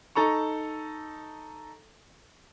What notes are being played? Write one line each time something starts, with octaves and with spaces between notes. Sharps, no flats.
D#4 A4 A#5 C#6